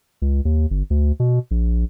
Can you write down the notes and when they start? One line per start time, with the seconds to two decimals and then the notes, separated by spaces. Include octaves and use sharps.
0.22 C#2
0.45 D#2
0.71 G1
0.90 D2
1.20 B2
1.51 A#1